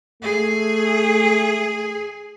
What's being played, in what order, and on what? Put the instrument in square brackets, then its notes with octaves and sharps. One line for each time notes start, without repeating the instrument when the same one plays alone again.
[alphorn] A3 [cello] G#4